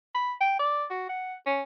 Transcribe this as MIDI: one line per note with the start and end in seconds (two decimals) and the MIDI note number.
0.15 0.33 83
0.41 0.55 79
0.59 0.85 74
0.91 1.05 66
1.09 1.34 78
1.46 1.62 61